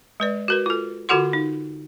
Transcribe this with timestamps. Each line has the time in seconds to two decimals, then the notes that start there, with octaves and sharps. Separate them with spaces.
0.20 G#3 B4 D5
0.48 F#4 A#4 B4
0.66 F4 A4
1.09 D3 F4 F#4 A4 F#5 C6
1.33 D#4